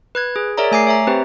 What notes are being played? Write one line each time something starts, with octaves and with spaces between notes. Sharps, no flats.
B4 F#6 G#6
G#4
G#4 A#4 C#5 D5 E5 A#5
A3 G#5 D6 C7
C#5 E5 A#5
C4 G4 B4 C5